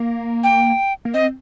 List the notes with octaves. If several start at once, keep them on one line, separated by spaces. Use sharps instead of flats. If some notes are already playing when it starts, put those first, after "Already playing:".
Already playing: A#3
G5
A#3
C4 D#5